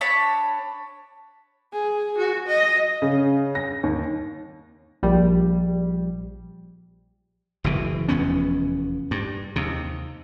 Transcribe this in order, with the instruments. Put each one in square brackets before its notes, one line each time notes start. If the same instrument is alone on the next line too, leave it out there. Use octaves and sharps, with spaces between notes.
[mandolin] D4 C#5 A5 B5
[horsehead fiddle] G#4
F#4
D#5
[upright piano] C#3
A#6
D#2
[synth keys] A#1 G3
[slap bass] F#1 B2 E3
F1 E2 B3 C#4
G2
D#2 C3